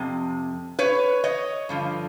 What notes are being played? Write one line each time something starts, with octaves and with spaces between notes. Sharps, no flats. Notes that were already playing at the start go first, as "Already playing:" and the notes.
Already playing: F2 C3
B4 C#5
C#5 D#5
G2 D3 F3